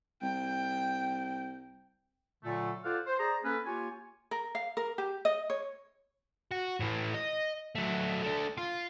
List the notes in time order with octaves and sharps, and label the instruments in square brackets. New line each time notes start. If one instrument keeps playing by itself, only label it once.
[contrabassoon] C2 [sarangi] G5
[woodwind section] A#2 D3 F#3 A3
F4 A4 C5 D5 F5 F#5
C5
G#4 C5 D5 A#5
A#3 C#4 A4 B4
A#3 F4 G4 C#5 G#5
[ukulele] A#4
F5
A#4
G4
D#5
C#5
[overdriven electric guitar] F#4
A2 E3
D#5
F#3 A3
A3 D4
F4